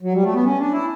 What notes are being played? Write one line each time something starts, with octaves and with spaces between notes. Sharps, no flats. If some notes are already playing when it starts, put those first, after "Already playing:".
F#3
G3
A3
B3
C#4
D4
E4